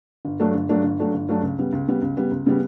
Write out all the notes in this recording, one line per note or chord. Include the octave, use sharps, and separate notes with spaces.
G1
G2 F#3 A3 D4
G1
G2 F#3 A3 D4
G1
G2 F#3 A3 D4
G1
G2 F#3 A3 D4
C#2
C#3 G3 B3
C#2
C#3 G3 B3
C#2
C#3 G3 B3
C#2
C#3 G3 B3